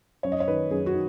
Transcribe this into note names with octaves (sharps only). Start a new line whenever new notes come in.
F#2 C#5
D#5
C#5
D#3 B4
F#2 G#4
F#4
D#3